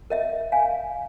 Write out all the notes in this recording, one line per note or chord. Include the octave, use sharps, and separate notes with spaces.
A#4 D#5 E5
F5 G#5